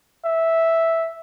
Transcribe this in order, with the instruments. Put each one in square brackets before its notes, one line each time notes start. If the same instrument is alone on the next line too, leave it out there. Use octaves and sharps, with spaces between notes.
[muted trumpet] E5